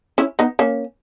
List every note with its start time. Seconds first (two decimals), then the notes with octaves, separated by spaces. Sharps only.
0.18 C#4 E4
0.39 B3 D#4
0.59 A#3 C#4